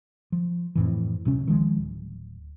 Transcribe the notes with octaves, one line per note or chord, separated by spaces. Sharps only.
F3
F2 A2 E3
D1 C3 C#4
D#3 F3 G#3
D1